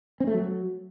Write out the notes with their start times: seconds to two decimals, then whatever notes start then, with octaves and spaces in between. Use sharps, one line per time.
0.20 C4
0.27 A3
0.34 F#3